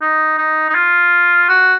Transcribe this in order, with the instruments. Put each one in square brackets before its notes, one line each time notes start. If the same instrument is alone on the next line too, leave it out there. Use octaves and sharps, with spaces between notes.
[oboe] D#4
D#4
D#4
F4
F#4